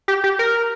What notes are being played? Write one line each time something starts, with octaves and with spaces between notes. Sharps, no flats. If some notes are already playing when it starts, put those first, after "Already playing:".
G4
G4
A#4